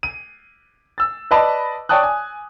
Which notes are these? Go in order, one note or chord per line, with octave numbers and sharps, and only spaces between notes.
D#7
E6 A6
B4 D5 D#5 A5 B5
C#5 D5 G5 A5 D#6 F#6
G#5